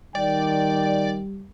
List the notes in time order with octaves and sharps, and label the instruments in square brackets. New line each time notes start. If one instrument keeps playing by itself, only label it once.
[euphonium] D#3 [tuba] G3 [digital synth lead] D5 [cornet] G5